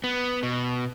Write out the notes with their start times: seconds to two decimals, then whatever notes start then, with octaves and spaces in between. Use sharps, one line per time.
0.04 B3
0.43 B2